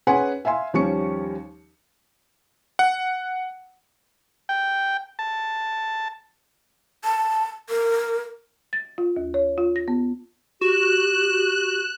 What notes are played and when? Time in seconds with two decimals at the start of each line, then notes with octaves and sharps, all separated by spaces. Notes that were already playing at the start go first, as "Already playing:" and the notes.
0.07 C#4 G#4 B4 F#5 G#5 C6
0.45 E5 F5 G#5 C6
0.73 D#2 F3 G3 C#4 C#6 C#7
2.79 F#5
4.49 G5
5.19 A5
7.04 A5
7.69 A#4
8.73 A6
8.98 F4
9.16 D#2
9.34 C#5
9.58 F4
9.76 A#6
9.88 B3
10.61 F#4 G4 F#6 E7